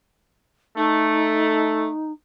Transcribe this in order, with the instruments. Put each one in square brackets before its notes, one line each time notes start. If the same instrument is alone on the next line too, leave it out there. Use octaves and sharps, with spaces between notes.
[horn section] A3 [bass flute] D#4